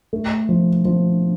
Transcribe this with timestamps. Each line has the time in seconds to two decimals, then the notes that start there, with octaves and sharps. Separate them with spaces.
0.13 A3
0.49 F3
0.85 F3